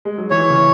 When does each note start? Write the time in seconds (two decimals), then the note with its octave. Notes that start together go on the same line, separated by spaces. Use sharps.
0.05 G#3
0.18 F#3
0.30 E3 C#5
0.50 C#3